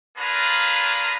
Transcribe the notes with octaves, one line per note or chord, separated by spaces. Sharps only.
A#3 D4 F4 G#4 B4 A#5